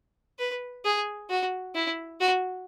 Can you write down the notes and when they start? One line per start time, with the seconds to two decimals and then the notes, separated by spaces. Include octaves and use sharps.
0.39 B4
0.85 G#4
1.30 F#4
1.75 E4
2.20 F#4